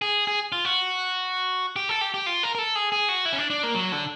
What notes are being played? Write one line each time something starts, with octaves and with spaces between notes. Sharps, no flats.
G#4
G#4
F4
F#4
G4
A4
G4
G4
F4
A#4
A#4
A4
G#4
G#4
F#4
E4
C#4
D4
D4
A#3
F#3
D3